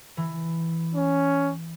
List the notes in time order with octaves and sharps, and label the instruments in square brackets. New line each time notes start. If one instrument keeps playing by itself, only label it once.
[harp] E3
[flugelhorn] C#4